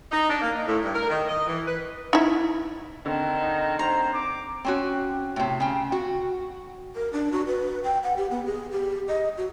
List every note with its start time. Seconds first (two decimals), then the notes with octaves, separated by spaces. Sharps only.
0.11 D#4
0.29 D4
0.42 A#3
0.55 D#4
0.67 A2
0.83 G2
0.95 A#4
1.10 D#3
1.27 D#5
1.47 E3
1.67 B4
2.13 D#4 E4
3.06 D3 D#3 C4
3.40 D#4
3.79 C5 A#5
4.14 D6
4.64 C4 C#4 F#4
5.36 A2 C3
5.60 C#3 G5
5.92 F#4
6.95 A#4
7.13 D4
7.32 F#4
7.47 B4
7.84 G5
8.03 F#5
8.17 G4
8.31 B3
8.46 G#4
8.72 G4
9.08 D#5
9.37 F#4